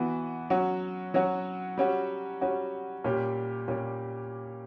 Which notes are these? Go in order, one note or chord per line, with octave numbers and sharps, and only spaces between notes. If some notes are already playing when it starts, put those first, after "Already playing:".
Already playing: E3 B3 F#4
F#3 C#4 F#4
F#3 C#4 F#4
G3 C#4 F#4
G3 C#4 F#4
A#2 G3 C#4 G4
A#2 G3 C#4 G4